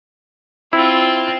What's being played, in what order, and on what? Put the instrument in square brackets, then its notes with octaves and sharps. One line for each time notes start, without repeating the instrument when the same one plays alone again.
[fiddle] C4 F4 [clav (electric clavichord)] E4